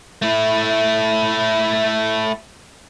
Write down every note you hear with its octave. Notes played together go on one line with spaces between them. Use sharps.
A3 E4